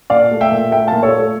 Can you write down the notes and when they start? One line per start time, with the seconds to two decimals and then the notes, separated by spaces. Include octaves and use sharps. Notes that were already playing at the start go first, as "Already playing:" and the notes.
0.10 A#2 D5 F5
0.31 A3
0.41 E5 G5
0.52 A#2
0.71 A3 E5 G5
0.87 A#2 F5 A5
1.03 A4 C#5
1.12 A3
1.18 A4